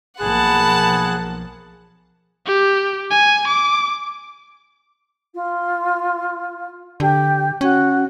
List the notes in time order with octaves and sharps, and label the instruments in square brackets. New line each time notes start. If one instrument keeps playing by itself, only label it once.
[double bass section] B1 F3 A#3 [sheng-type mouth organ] G#4 F#6 [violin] F#5 A5 [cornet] B5
[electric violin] G4
G#5
D6
[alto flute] F4
[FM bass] D3 [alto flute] G4
[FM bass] C#4 [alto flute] F#4